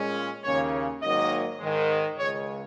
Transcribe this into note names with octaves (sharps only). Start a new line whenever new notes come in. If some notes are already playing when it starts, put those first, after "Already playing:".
Already playing: A#2 G#3 C#4
D#2 C#3 A#3 C#4 C#5
G#2 D#3 F#3 A#3 D#5
G#2 D#3 G#3
C#2 C#3 G#3 C#5